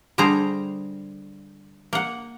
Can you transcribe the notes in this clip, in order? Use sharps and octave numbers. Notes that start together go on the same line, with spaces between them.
D3 G3 G#4 C5 A#5
A#3 F#5